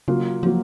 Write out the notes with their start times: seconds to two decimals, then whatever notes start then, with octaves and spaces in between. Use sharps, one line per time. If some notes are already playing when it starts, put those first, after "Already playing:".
0.08 C#3 F#3 A#3 F4
0.43 F3 F#3 A#3 F4